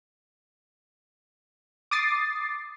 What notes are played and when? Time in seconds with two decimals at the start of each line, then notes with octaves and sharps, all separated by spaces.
1.91 D6 D#6 A6 C7